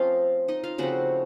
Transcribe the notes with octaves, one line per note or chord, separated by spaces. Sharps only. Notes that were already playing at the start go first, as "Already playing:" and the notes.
Already playing: F3 A3 C4 C#4 F4 D#5 F5
D#4 D#5
F4 F5
C#3 F3 A3 C4 F#4 F#5